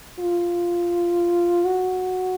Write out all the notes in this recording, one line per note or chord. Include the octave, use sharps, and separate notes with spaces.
F4
F#4